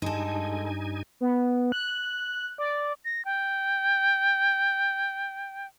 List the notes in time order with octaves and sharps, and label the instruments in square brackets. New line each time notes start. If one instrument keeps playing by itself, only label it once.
[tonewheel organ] G2 D#4 G#5 [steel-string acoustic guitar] G#3 A4
[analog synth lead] B3
F#6
D5
[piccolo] A#6
G5